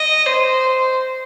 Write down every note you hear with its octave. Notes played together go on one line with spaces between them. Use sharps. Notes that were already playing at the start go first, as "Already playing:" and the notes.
Already playing: D#5
C5